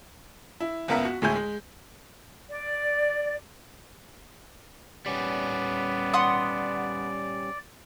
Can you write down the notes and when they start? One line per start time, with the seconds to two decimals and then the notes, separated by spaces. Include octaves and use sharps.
0.60 E4
0.88 F#1 C#2 B3 A#4 E5 B6
1.05 F#4
1.22 D2 A2 G#3 E4 G#5 G6
1.35 G#3
2.49 D5
5.06 G3 B3 C#4 D5
6.13 F#5 C6 D#6